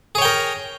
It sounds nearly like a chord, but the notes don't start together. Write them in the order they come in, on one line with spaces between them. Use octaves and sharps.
G#4 C#5 G5 A#4